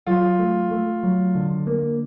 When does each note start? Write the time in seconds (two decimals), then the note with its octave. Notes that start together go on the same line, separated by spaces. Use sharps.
0.07 F#3 F4
0.39 A3
0.71 A3
1.03 F#3
1.35 D3
1.67 A#3